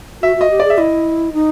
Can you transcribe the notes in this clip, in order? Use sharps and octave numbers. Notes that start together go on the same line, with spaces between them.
F#4 E5
F#4 D#5
G4
G#4 D5
E5
E4 D#5
D#4